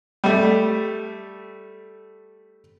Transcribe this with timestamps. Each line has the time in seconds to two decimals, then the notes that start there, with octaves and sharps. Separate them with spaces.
0.24 G3 A3